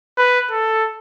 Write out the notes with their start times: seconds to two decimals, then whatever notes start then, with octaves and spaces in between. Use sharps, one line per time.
0.17 B4
0.51 A4